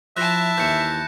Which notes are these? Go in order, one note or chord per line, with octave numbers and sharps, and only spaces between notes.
F3 E4 F4 E5 A5 F#6 A#6 E7
D#2 E3 G6 C#7